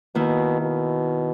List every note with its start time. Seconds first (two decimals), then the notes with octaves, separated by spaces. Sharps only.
0.15 B2 D#3 A#3 E4
0.61 B2